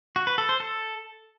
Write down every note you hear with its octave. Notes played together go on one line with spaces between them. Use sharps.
F#4
B4
A4
C5
A4